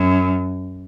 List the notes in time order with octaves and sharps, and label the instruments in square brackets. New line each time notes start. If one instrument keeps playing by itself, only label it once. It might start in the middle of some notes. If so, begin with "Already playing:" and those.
Already playing: [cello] F#2